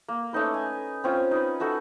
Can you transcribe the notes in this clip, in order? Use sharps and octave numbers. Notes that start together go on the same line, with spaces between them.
A#3
A3 C#4 D#4 B4
G#5
C4 C#4 F4
D#4 B4
D#4 F#4 A4 E5